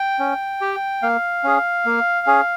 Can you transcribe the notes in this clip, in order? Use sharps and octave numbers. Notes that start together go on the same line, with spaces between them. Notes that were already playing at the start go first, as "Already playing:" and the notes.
Already playing: G5
C#4
G4
A#3 F5
C#4 G#4
A#3
C#4 G#4